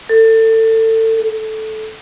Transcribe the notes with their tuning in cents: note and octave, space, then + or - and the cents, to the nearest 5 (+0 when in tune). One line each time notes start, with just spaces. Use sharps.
A4 +25
A4 -10